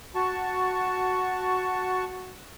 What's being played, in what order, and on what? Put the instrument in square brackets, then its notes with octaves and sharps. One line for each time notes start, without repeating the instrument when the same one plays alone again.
[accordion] F#4 A5 C#6